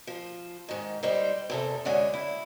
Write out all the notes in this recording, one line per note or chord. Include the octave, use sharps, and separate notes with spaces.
F3
G#2 D#3
G3 D#4 C5
E2 C3 A4
F#2 D3 G#3 D4 C#5
E4